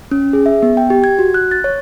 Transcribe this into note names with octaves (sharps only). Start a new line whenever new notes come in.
C#4
G#4
E5
B3
G5
G4
G#6
F#4
F#6
A6
C#5